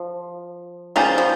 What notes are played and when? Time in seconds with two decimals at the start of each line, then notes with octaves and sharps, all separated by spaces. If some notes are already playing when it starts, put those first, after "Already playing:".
Already playing: F3
0.96 D#3 G3 C#4 F4 G#4 C5
1.18 F3